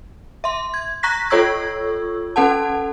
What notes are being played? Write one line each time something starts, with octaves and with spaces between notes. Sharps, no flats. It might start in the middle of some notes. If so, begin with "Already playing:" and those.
E5 C6
G#6
A#5 C#6 F#6 A#6 B6
F4 A4 C#5 C#6 E6 G#6
C#4 A4 F#5 A5